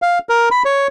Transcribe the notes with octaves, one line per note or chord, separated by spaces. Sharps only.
F5
A#4
B5
C#5